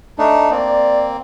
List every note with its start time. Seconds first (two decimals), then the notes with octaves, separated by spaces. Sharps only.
0.18 A3 D4 D#4
0.51 A#3 C4 D5